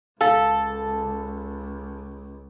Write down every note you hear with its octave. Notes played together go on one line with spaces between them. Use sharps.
C#2 A4 F5